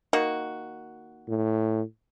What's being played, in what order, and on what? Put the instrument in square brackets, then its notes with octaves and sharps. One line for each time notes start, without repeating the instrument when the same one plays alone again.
[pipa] D#3 A#3 F#4
[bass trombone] A2